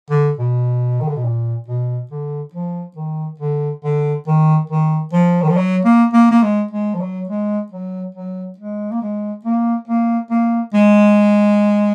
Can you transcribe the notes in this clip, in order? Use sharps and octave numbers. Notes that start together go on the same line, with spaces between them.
D3
B2
D#3
D3
B2
A#2
B2
D3
F3
D#3
D3
D3
D#3
D#3
F3
D#3
F3
F#3
A#3
A#3
A#3
G#3
G#3
F3
F#3
G#3
F#3
F#3
G#3
A#3
G#3
A#3
A#3
A#3
G#3